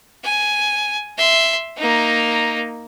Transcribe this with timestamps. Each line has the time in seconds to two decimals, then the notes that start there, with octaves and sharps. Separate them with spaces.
0.24 G#5
1.17 E5 C6
1.77 A#3 D#4